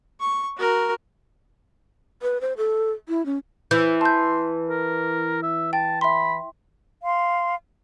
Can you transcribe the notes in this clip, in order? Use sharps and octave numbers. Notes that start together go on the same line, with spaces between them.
C#6
F#4 A#4
B4
C5
A4
E4
C#4
E3 G6
A5 C6 G6
A#4
E5
G5 A5
E5 B5 C6
F5 C6